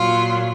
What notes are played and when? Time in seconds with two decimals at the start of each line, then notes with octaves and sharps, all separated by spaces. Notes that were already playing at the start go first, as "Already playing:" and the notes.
Already playing: A#2 F#3 F4